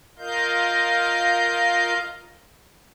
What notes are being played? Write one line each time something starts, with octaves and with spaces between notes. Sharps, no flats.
F4 A#4 D#5 F5 G6